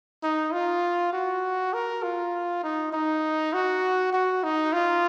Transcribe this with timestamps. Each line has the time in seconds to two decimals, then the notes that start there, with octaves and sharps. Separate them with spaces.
0.23 D#4
0.53 F4
1.13 F#4
1.73 A#4
2.03 F4
2.63 D#4
2.93 D#4
3.53 F#4
4.13 F#4
4.44 D#4
4.73 F4